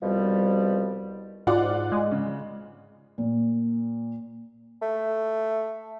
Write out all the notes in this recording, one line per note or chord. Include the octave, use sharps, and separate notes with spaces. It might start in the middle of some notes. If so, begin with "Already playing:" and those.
C2 B2 F3 G3
G#2 F4 D5 F#5
G#3
C#3
A#2
A3